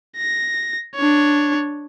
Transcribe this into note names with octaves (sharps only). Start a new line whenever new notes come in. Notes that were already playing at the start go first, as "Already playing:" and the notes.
A#6
D4 C#5